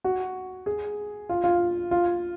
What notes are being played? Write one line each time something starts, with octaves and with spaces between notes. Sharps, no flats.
F#4
G#4
F4
F4
F4